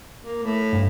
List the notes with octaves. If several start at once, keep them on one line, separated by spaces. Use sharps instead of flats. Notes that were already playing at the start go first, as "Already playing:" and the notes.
A#3
A2
G2